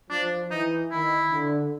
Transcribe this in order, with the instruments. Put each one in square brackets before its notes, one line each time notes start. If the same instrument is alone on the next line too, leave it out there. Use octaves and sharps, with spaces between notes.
[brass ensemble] F3 [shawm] D4
[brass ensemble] E3 [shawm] D#4
[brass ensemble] D#3 [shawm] E4
[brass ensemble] D3